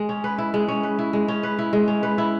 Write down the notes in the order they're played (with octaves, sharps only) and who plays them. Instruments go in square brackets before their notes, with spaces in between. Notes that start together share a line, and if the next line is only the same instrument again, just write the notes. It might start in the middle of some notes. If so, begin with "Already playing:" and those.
Already playing: [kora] G#3
C#4
B4
E4
G#3
C#4
B4
E4
G#3
C#4
B4
E4
G#3
C#4
B4
E4